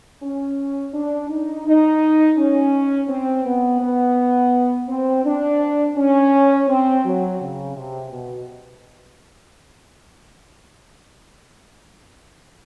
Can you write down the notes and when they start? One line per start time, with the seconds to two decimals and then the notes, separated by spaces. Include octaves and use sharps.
0.23 C#4
0.94 D4
1.30 D#4
1.66 D#4
2.38 C#4
3.09 C4
3.45 B3
3.82 B3
4.89 C4
5.25 D4
5.97 C#4
6.68 C4
7.05 F#3
7.41 C#3
7.76 C3
8.12 B2